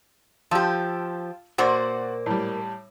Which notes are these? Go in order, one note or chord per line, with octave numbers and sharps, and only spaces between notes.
F3 F4 G4 A5 E6
A#2 A#3 F#4 C5 D5 F#5
A2 G3